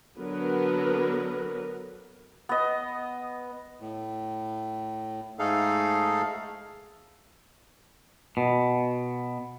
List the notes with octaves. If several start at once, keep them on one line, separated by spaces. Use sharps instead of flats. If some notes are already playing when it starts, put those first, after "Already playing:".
D3 F#3 B3 A#4 B4
B3 D#5
A2
G#2 A3 D#4 G#4 A4 F5
B2